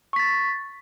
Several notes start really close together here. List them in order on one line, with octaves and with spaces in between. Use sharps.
C#6 B6 A6